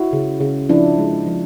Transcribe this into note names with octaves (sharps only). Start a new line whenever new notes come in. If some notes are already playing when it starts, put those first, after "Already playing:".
Already playing: E4 F#4
C#3
C#3
F3 D4 E4
G#3
F3